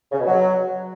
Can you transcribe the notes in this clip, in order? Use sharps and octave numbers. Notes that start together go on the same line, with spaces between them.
C#3
B2
F#3